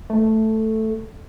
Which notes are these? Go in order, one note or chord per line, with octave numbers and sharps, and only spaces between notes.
A3